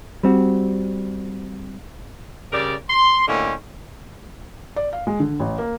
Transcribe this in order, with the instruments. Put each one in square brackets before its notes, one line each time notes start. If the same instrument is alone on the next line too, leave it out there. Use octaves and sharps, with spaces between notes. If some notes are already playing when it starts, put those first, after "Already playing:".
[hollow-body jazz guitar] G3 C4 F#4
[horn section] C#3 G3 G4 A#4 D5
C6
A2 D3 G#3 A#3 C4 C#4
[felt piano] D5
F5
G#3
D3
A1
A#3